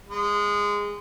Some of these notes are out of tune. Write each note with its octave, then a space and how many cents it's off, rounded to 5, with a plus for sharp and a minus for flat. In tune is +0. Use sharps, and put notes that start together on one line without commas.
G#3 -15